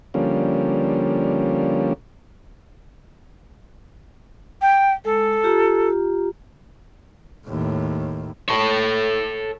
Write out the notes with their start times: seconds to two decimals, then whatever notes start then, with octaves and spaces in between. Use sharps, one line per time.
0.14 D3 F3 G3 A#3 C#4
4.62 G5
5.05 G#3 A4
5.43 F4 G4 A#5
7.46 D#2 A2
8.49 A4 C#5